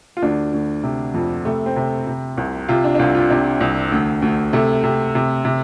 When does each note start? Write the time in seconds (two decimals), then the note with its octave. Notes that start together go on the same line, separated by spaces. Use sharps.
0.17 F4
0.22 D2 D4
0.54 D2
0.83 C3
1.14 F2
1.45 C3 A3
1.66 C4
1.76 C3
2.07 C3
2.37 C2
2.69 C3 F4
2.84 D4
2.95 D4
2.99 C2 F4
3.15 F4
3.30 C3 D4
3.61 C2
3.92 D2
4.22 D2
4.53 C3 A3
4.84 C3
5.15 C3
5.45 C3